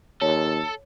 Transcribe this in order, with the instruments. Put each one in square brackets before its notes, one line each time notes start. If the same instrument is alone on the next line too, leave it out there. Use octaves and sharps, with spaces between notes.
[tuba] D#2 [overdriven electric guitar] A4 [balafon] C#5